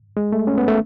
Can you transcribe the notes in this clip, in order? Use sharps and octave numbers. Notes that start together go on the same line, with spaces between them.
G#3
A3
C#4
B3
A3